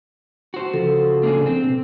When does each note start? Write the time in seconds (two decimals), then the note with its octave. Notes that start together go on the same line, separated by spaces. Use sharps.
0.54 F#4 C5
0.74 C#3 F3 A4
1.23 A#3 D4 G#4
1.46 C4
1.64 B2